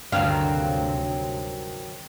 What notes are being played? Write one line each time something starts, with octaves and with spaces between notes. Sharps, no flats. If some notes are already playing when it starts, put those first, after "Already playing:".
D2 G2 C3 D#3 F#3 C4 F5